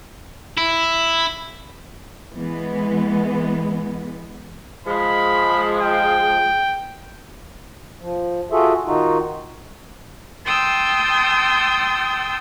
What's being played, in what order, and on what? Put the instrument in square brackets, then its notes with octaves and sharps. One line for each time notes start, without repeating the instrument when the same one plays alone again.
[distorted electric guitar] E4
[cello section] E3 G#3 B3
[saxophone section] F3 G#3 [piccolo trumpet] B5
[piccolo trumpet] G5
[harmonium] F3
F4 F#4 G#4 A4 E5
D#3 D#4 F4 F#4
[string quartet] G5 A5 C6 D#6 E6 G6